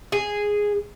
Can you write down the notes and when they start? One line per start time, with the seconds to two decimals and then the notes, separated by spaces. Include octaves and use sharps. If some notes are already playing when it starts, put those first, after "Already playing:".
0.12 G#4